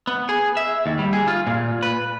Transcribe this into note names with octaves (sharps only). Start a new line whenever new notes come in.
B3
G#4
E5
D#2
G3
G#4
F4
A#2
B4